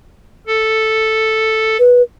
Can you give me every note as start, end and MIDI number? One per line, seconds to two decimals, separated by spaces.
0.47 1.77 69
1.79 2.02 71